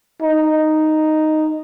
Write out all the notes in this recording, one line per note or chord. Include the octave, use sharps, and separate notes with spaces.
D#4